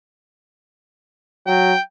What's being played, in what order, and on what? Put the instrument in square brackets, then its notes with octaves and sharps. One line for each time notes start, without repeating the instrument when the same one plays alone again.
[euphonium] F#3 [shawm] G5